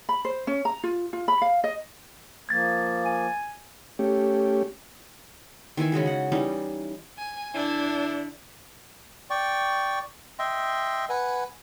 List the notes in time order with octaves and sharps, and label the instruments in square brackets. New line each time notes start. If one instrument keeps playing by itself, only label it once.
[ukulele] B5
C5
C#4
A#5
F4
F4
B5
F5
D#5
[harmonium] F3 A#3 [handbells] G#6 A6
[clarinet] G#5
[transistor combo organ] A3 C#4 G4
[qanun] D#3 E3 E5 G#5
C#3 G#3 F#4 G#4
D#5 F#5
E3 G3 C#4 D#4
[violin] G#5
[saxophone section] D3 E4 [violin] D4
[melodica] D5 G5 C#6
D#5 E5 G5 C6
B4 F#5 G#5